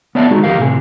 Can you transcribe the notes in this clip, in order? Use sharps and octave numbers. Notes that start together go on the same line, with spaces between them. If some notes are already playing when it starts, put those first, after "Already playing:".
B3 C#5 D5 E5 A5
G#3 D#4 F#4 G#4
F2 C#3 G4 A#4 F5
A2 C3 G#4